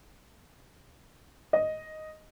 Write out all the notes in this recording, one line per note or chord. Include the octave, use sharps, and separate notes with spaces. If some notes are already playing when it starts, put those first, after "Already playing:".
D#5